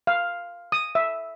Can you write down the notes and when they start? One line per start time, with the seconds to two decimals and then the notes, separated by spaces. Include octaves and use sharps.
0.07 F5
0.72 D#6
0.95 E5